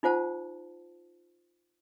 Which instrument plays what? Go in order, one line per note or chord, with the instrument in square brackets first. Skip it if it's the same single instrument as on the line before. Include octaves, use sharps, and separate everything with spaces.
[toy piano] D#4 F4 C5 F#5 A5